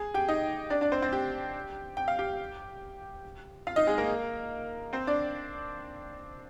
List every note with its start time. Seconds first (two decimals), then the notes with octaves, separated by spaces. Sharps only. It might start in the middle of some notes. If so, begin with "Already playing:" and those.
Already playing: G#4
0.14 G4 G5
0.28 D#4 D#5
0.70 D4 D5
0.81 D4 D5
0.92 C4 C5
1.02 C4 C5
1.12 G4 G5
1.97 G5
2.08 F5
2.19 G4 G5
3.67 F4 F5
3.76 D#4 D#5
3.87 G#3 G#4
3.98 A#3 A#4
4.93 C4 C5
5.07 D4 D5